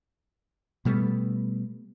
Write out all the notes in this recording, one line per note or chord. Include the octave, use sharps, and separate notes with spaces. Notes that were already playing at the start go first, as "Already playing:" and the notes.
B2 G3 A3 B3